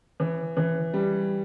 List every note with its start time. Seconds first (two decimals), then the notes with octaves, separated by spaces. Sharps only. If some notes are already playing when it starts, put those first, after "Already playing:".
0.20 E3
0.57 E3
0.94 G3